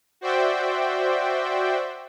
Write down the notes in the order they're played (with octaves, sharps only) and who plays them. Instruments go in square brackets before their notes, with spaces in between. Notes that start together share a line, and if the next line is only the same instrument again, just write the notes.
[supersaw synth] F#4 C5 D5 E5 G5